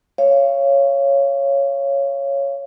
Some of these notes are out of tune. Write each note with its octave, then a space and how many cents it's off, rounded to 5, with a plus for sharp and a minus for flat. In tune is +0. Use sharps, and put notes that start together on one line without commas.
C#5 +0 F5 -25